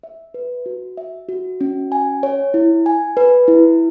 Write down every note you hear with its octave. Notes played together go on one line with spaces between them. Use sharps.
E5
B4
F#4
E5
F#4
C#4
G#5
C#5
E4
G#5
B4
E4